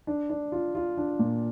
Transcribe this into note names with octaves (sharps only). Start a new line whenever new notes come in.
D4
D4
F4
F4
D4
A#2